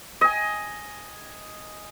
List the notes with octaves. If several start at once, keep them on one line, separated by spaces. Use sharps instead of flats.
D#5 G#5